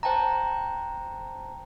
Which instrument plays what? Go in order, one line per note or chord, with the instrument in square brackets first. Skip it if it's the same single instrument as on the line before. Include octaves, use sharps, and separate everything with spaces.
[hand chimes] C5 G5 A5 A#5